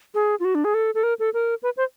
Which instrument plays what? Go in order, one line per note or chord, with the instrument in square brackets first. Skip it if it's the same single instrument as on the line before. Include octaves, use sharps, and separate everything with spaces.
[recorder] G#4
F4
F#4
D4
G#4
A4
A4
A#4
A4
A#4
B4
C5